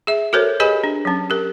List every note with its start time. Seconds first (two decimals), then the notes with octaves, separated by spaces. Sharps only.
0.07 G#4 E5
0.33 F#4 A4 A#4 C5 C#5
0.60 G4 G#4 B4 D#5 G#5 B5
0.84 D4
1.05 F#3 C#4
1.30 G4 A#4